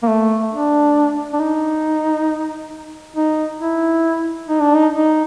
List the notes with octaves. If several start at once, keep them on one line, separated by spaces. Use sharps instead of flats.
A#3
A3
D4
D4
D#4
D#4
E4
D#4
D4
D#4
D#4